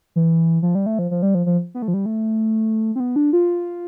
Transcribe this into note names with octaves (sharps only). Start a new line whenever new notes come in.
E3
F3
G3
A3
F3
F3
G3
F3
F3
B3
A3
F3
G3
A3
C4
B3
D4
F4